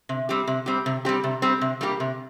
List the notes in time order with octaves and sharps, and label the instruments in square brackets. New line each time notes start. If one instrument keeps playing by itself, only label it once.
[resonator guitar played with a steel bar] C3
G3 C4 G4
C3
G3 C4 G4
C3
G3 C4 G4
C3
G3 C4 G4
C3
G3 A#3 G4
C3